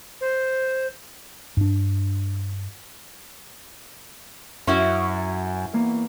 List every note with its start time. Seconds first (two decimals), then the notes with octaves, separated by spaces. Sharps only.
0.21 C5
1.57 G2 D4
4.67 F#2 C#4 E4 F#4
5.73 E2 A#3